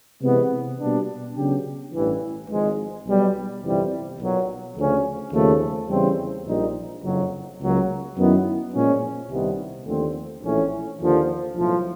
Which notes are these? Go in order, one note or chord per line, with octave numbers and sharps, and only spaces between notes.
C3 E3 G#3 B3
B2 G3 A#3 D4
C#3 F#3 B3 D4 G4
A1 G2 E3
G#1 G#2 F3 G#3
B1 B2 G3
G1 F2 C3 E3 G3
B1 A#2 F#3
D2 C#3 F3 A3 C#4
D#2 C#3 F3 A3
E2 C#3 E3 G3 C4
A#1 A#2 G3 A#3 D#4
F#1 F2 C#3 F#3
C#2 C#3 F#3 A#3
F#2 D#3 F#3 B3 E4
A#2 F3 G#3 C#4
C2 C3 D#3 G3 B3
D#2 D3 F3 A3 C4
A#1 A2 E3 A3 C#4
D#2 D3 F3 A#3
B1 A2 F3